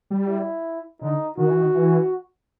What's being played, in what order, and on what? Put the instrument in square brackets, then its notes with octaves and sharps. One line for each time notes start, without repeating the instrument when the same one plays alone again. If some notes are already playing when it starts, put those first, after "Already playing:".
[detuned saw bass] G3
[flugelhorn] E4
[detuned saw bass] D3 [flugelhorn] D#4
[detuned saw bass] D#3 [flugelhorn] F#4
[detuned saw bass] E3
D#3
E3